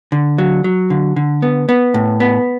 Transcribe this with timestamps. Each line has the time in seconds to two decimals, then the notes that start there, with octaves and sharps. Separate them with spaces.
0.12 D3
0.38 F#3
0.64 F#3
0.90 D3
1.16 D3
1.42 B3
1.69 B3
1.94 A2
2.20 B3